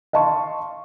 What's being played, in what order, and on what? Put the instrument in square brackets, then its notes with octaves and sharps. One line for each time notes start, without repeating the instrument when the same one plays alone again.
[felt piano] D#5 F5 A5 C6 C#6